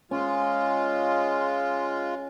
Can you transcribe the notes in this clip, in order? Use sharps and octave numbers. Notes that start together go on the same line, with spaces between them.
G#3 C#4 F4